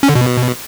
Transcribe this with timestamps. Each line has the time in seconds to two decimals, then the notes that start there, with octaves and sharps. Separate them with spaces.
0.03 C#4
0.09 D3
0.15 B2